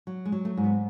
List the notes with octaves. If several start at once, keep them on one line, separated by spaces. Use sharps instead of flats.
F#3
G#3
F#3
A3
G#2
B3